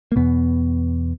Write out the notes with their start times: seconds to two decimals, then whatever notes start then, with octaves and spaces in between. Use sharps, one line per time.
0.12 A#3
0.16 E2 B2 B3